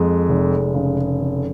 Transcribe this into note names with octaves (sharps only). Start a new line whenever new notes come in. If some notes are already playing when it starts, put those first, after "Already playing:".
Already playing: F2 G#3
F1
C#3
F2